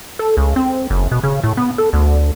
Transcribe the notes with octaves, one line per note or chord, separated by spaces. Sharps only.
A4
C#2
C4
F#1
B2
C#3
A2
B3
A4
D2